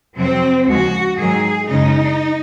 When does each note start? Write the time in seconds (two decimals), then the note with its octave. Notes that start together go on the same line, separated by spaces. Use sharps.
0.16 F2 C3 F#3 C4
0.67 D#2 C#3 F3 G#3 F#4
1.18 G#2 D#3 F#3 G#4
1.69 F#2 C#3 G#3 D#4